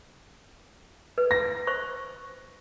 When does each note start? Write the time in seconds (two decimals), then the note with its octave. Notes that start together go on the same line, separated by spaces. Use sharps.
1.18 B4
1.31 A#6
1.67 C5 C#6